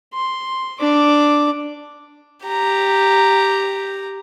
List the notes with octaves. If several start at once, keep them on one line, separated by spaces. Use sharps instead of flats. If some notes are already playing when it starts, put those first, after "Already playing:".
C6
D4 D6
G4 A#5